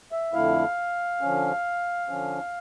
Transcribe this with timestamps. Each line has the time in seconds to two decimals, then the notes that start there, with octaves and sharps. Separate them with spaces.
0.12 E5
0.34 F2 D3 A3 E4 F5
1.21 D3 F3 C#4
2.09 D3 F3 C#4